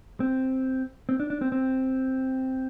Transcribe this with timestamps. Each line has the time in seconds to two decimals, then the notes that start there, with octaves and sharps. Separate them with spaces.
0.20 C4
1.09 C4
1.20 D4
1.30 D4
1.41 C4
1.52 C4